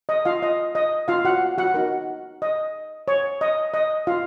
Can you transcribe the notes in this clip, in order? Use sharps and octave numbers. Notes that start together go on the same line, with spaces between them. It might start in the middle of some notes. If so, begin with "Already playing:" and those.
D#5
F4 F5
D#5
D#5
F4 F5
F#4 F#5
F#4 F#5
D#4 F#4 A#4
D#5
C#5
D#5
D#5
F4 F5